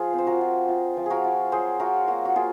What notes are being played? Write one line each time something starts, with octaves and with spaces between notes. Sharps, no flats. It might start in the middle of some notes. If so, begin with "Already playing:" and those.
Already playing: F3 F4 G#4
C4
C5
F#4 A#4
F4
F4
F3
F#4 G#4 A#4
F4
F#3 G#4 C5
F4 F#4 A#4
A#3 F#4
F#4
A#3 F4 G#4